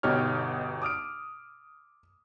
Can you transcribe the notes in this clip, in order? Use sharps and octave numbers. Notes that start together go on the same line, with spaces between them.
G1 B2 D#4 G4 C#5 F6
D6 D#6 F6 D7